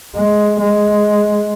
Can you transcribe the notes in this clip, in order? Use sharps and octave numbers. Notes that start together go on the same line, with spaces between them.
G#3
G#3